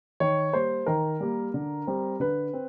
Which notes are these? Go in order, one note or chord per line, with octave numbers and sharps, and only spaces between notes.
D#3 C#5
G3 A#3 C5
D#3 A#4
G3 A#3
D3
G3 C4
D3 B4
C4